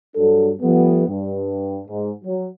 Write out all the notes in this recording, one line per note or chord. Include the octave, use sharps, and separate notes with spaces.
G2 F#3 D4 A4
F3 G3 A3 B3
G2
G#2
F#3